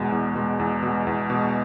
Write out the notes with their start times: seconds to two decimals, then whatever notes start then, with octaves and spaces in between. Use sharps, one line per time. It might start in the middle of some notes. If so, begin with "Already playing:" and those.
Already playing: E2 B2 G#3
0.12 E2
0.35 B2 G#3
0.59 E2
0.83 B2 G#3
1.07 E2
1.30 B2 G#3